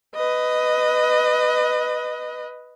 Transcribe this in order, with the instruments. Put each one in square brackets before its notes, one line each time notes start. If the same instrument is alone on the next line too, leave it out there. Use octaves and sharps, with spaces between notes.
[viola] B4 D#5